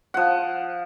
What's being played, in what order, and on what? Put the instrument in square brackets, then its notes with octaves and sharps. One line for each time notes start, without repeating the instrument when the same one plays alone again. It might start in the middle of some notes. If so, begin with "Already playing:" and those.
[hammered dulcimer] F3 F#5